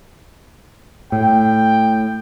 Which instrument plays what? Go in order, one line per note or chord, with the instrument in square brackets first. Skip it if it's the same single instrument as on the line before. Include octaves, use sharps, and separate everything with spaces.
[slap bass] A2 [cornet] G5